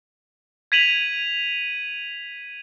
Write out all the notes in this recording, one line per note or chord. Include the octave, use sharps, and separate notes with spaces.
G#6 B6 D#7 F7 F#7